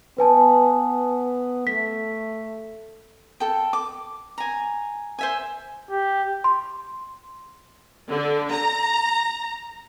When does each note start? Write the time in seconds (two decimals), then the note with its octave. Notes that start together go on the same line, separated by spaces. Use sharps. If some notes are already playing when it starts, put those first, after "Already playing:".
0.18 B3 B4 G#5 A5
1.67 A3 B6
3.40 A4 G5
3.73 D6
4.38 G#5 A#5
5.19 C5 E5 G#5
5.90 G4
6.44 C6
8.09 D3
8.52 A#5